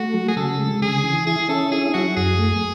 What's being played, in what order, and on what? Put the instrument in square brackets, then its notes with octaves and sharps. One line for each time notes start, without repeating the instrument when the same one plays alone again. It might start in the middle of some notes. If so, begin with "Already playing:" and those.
Already playing: [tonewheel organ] A3 [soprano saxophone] F#4
[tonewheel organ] F#3
[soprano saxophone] G#4
[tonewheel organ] C#3 [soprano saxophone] A4
[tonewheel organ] G#3
[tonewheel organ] C#3 [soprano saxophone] G#4
[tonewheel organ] E3
[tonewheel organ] E4 [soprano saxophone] G#4
[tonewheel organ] C#4 [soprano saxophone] A4
[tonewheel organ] E4 [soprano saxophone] G#4
[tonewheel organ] F#3 [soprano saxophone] F#4
[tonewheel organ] F#2 [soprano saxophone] G#4
[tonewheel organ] A3